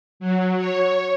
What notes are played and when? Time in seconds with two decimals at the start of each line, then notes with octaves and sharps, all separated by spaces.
0.20 F#3
0.57 C#5